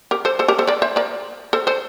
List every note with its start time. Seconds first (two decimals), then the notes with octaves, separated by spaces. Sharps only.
0.11 G4 A#4
0.25 A4 C5
0.39 A4 C5
0.48 G4 A#4
0.59 A4 C5
0.67 A#4 D5
0.82 C5 E5
0.96 A#4 D5
1.53 A4 C5
1.67 A4 C5